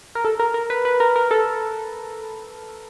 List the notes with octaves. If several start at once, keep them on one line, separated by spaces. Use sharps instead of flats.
A#4
A4
A#4
A#4
B4
B4
A#4
A#4
A4